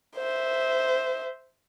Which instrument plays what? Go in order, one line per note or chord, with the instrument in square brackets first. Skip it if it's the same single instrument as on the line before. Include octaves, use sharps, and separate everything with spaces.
[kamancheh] C5 E5